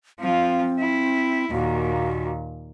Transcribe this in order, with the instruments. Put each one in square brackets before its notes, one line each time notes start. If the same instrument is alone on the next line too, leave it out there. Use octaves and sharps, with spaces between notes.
[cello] F3 F4 [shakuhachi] C4
[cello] E4
[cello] D#2 A#2 [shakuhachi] F#4